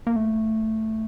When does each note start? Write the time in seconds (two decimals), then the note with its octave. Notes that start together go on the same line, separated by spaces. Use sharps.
0.07 A#3
0.16 A3